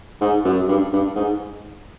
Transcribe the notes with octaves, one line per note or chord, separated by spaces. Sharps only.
G#2
F#2
G2
G2
G#2